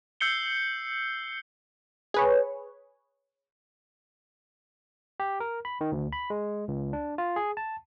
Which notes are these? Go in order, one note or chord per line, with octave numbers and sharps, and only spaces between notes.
E6 G6 C7 C#7 G7
G#4 B4 C#5
G4
A#4
B5
D#3
D2
B5
G#3
C#2
D4
F4
G#4
A5